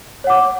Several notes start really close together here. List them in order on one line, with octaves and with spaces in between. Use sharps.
C#5 F#5 D6